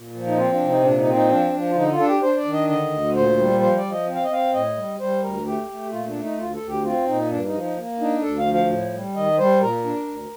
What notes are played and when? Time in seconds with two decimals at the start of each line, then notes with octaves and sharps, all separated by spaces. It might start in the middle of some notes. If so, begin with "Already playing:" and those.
Already playing: A#2
0.14 F3
0.27 D#4
0.37 C4 F4
0.53 D4
0.60 C3
0.68 D#4
0.83 A#2 D4
0.99 D#4
1.07 C4
1.14 D#4
1.30 F3 D4
1.53 F3
1.70 F4
1.75 D3 D#4
1.91 F4
1.99 D4 A4
2.07 G4
2.22 D4 C5
2.37 D5
2.45 D#3
2.53 D#5
2.68 D3 D#5
2.91 D2
3.15 A#2 C5
3.37 G3
3.61 F3 C5
3.76 D5
3.83 F3
3.92 D#5
4.06 C4
4.15 F5
4.24 D#5
4.30 C4 F5
4.53 A2 D#5
4.76 G3
5.00 G3 C5
5.22 D2 A#4
5.46 A3 G4
5.69 A3
5.92 A#2 F4
6.07 D4
6.15 A3
6.23 D#4
6.38 D2 F4
6.53 A4
6.61 D2
6.68 G4
6.84 C4 F4
7.07 A#2 D#4
7.30 G2 D4
7.46 D#4
7.53 F3
7.61 D#4
7.77 A#3
8.00 D4 D#4
8.23 D2 A4
8.39 F5
8.46 F3
8.54 F5
8.69 A2
8.93 G3
9.15 D#3 D#5
9.38 G3 C5
9.61 A#2 A#4
9.84 D4
10.07 D2